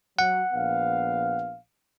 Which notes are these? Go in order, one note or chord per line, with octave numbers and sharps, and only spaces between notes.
F#3 F#5
A#1 B3 F5